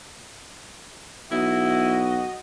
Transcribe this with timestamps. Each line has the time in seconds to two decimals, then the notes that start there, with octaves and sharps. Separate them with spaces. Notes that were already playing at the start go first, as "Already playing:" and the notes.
1.31 B1 E4 F#4 D#5